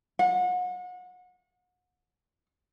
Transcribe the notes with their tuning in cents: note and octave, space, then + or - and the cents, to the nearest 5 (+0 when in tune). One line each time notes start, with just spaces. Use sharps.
F#5 -35